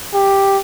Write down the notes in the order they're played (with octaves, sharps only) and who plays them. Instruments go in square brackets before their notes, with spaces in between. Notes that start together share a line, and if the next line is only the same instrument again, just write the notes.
[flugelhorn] G4